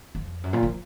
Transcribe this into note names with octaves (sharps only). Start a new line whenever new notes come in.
F2
F#2
A#2
F3